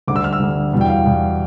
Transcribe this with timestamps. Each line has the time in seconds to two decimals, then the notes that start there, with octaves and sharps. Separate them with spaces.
0.08 D2 D3 G3 D6
0.16 E6
0.24 F6
0.33 E6
0.40 D2 D3 G3
0.73 E2 B2 G3
0.81 G5
0.89 F5
1.05 E2 B2 G3